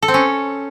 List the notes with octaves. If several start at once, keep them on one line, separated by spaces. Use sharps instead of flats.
A4
C4
C#4